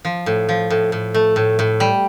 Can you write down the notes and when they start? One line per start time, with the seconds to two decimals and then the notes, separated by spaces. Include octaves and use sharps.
0.05 F3
0.26 A2
0.49 F3
0.70 A2
0.92 A2
1.14 A3
1.36 A2
1.59 A2
1.80 G3